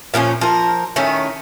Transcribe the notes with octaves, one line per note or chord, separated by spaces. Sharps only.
A#2 F3 A#3 C#4
F3 A#4
D#3 A3 C#4 E4